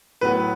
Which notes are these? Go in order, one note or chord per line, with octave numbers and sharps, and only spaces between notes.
A2 F#3 B3 B4